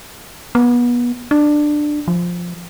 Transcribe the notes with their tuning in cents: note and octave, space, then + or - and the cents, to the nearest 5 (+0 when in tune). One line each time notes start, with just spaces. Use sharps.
B3 -30
D4 +15
F3 +5